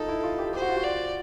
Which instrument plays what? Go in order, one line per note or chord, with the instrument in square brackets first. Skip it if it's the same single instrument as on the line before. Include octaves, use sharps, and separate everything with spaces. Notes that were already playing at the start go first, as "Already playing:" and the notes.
Already playing: [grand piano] D#4 F4 [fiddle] A4
[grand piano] E4
F4
G4
[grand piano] G4 [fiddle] C5
[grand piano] F#4
F4
F#4
[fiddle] D5